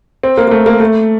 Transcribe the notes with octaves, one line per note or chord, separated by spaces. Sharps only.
C4
A#3
A#3
A3
A#3
A3